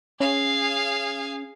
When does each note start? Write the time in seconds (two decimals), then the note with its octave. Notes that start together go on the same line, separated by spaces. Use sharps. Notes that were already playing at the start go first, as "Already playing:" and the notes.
0.20 C#4 G#4 F5